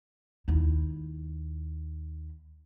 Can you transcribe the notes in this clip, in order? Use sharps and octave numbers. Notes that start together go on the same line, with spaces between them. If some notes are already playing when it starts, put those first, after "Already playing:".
D#2 E4